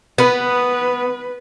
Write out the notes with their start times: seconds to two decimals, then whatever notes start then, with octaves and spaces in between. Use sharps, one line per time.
0.18 B3 B4